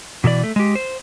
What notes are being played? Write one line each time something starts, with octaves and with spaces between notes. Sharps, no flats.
B2 E3 A4 D5
A3
G#3 G4
C5